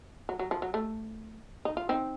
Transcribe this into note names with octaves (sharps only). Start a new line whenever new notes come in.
F#3
F#3
F3
F#3
A3
D#4
F4
C4 D#4